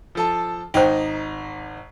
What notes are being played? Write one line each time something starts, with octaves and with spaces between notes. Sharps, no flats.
F3 A4 A5
G#1 D#4 C5 G5